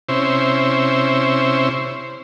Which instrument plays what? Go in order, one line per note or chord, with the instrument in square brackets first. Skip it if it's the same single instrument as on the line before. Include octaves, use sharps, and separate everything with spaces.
[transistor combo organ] C3 C#4 E4 C5